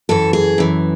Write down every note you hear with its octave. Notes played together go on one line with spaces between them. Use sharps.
F#2 E3 A4
G#4
F#2 E3